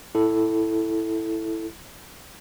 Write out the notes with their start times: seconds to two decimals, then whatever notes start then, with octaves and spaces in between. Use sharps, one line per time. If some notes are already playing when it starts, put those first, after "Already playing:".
0.15 E4 A4